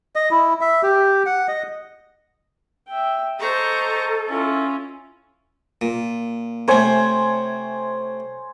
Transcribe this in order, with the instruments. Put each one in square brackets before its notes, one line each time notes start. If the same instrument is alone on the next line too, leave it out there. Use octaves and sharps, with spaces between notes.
[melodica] D#5
E4
E5
G4
F#5
D#5
[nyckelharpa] E5 G5
[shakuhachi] A4 [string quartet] C5 A#5 C#6 [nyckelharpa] D#5
[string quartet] C#4 [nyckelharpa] E4 F4
[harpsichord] A#2
[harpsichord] C3 A3 [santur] C5 C#5 G#5